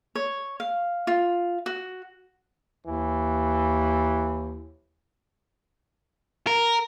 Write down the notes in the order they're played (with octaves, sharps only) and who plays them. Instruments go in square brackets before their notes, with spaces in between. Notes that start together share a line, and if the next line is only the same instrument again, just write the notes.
[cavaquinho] C#5
F5
F4
F#4
[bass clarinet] D#2 [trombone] E3
[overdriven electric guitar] A#4